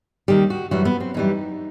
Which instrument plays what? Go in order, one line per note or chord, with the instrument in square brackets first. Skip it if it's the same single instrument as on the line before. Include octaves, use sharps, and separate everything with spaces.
[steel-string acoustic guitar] D#2 D#3 G3 G4
F#4
F#2 E3 G3 F#4
B3
C4
F#2 E3 G3 D#4